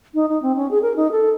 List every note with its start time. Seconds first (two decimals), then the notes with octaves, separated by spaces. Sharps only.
0.14 D#4
0.29 D#4
0.42 C4
0.56 C#4
0.71 G#4
0.82 A#4
0.96 D#4
1.11 A4